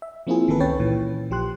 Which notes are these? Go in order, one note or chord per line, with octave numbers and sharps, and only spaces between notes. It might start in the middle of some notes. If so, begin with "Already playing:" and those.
E5
F3 A#3 C4 E4 F4 G#4
G1 D#3 E3 A#3 A4 B4
C#2 C#4 B4 C#5 G5 A6
A#2 E3
A#1 F3 G4 C6 F#6